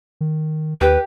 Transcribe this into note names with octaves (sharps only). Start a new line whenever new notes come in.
D#3
D#2 G4 B4